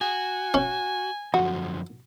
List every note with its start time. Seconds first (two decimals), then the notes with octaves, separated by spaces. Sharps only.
0.01 F#4 G#5
0.54 C#4
1.34 F#2 D3 F3 F#4